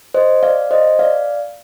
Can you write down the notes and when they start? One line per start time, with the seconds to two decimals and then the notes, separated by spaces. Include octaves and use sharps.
0.14 C5 D#5
0.43 D5 F5
0.71 C5 D#5
0.99 D5 F5